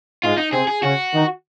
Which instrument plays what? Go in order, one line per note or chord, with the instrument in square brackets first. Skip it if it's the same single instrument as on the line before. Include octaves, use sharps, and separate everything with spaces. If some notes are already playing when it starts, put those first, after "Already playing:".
[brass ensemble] G#2 G#3 [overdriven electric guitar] F4
[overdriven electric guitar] D#4
[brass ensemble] C3 C4 [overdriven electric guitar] G#4
[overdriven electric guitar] G#4
[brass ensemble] C#3 C#4 [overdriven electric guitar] F#4
[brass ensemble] D#3 D#4